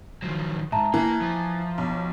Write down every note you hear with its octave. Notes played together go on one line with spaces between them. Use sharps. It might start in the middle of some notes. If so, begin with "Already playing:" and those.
D#3 F3 F#3
G#2 E5 A5 A#5
E3 A#3
F3
B1